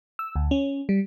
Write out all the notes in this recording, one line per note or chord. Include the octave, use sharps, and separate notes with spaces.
E6
D2
C#4
G3